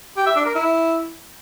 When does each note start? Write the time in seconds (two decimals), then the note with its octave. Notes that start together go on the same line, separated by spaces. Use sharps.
0.17 G4
0.26 E5
0.36 D4
0.45 A#4
0.55 E4